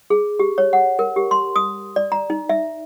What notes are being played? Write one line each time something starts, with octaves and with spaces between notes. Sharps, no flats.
G#4
G4
C#5
F#5
A#4
G4
C6
D#6
D5
A#5
D#4
E5